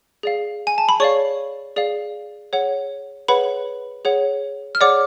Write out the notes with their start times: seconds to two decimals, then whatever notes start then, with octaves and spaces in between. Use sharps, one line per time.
0.23 G#4 D5 F5
0.67 G#5
0.78 A5
0.89 B5
1.00 G#4 C#5 D5 F5 C#6
1.76 G#4 D5 F5
2.53 G#4 C#5 F#5
3.28 G#4 B4 C#5 F#5 B5
4.05 G#4 C#5 F#5
4.75 F6
4.81 G#4 C#5 D5 F#5 D6